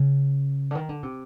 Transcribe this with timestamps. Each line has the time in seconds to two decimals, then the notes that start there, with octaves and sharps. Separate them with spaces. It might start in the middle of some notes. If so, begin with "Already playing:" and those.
Already playing: C#3
0.71 D3
0.75 D#3
0.89 D3
1.03 C3